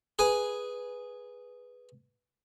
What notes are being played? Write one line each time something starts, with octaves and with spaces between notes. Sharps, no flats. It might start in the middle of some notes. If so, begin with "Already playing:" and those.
G#4 B4 G#5